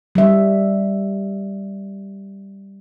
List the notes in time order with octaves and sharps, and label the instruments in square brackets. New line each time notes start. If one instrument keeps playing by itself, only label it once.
[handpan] G3 E5